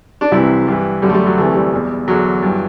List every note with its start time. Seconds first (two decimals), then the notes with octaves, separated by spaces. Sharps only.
0.21 D4
0.31 C2 C3 E3 E4
0.67 G2 E3
1.02 F#2 D3 G3
1.09 A3
1.14 G3
1.26 F#3
1.37 D2 C3 E3 A3
1.55 G3
1.72 E2 B2
2.07 E2 D3 F#3
2.42 G2 E3